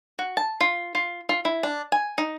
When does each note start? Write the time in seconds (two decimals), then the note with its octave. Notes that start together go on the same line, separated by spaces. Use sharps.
0.19 F#4
0.37 A5
0.61 F4
0.95 F4
1.29 F4
1.45 E4
1.63 D4
1.92 G#5
2.18 D#4